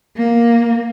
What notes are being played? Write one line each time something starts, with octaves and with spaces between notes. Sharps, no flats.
A#3